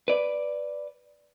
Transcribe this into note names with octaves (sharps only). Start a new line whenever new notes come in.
B4 D5